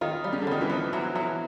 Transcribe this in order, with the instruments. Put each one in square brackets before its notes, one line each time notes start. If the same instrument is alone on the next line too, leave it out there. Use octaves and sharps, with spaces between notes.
[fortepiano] D#3 [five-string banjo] F4
[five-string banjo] G3
[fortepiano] C#3
D3
[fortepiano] D#3 [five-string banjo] G3
[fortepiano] E3
[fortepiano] F3 [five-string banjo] B3
[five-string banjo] E3 [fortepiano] F#3
[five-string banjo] E3 [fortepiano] F#3